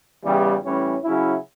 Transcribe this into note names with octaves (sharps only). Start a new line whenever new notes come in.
E2 C#3 E3 G3
A2 E3 G3 C#4
C#3 F#3 C#4 E4